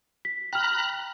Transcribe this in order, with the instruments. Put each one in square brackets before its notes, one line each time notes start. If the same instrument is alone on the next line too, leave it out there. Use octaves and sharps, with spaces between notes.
[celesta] B6
[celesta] G5 F6 [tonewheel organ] A#5 B5 F#6